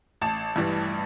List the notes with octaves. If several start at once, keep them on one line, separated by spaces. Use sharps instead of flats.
A1 A5
G2 E3 G3